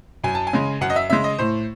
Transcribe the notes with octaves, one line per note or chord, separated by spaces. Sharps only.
F#2 G#5
A5
G#5
C#3 G#3
F#2 F#5
D#5
E5
C#3 G#3 E5
D#5
A2 C5